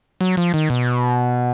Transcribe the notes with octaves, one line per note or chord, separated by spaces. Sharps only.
F#3
F3
D#3
B2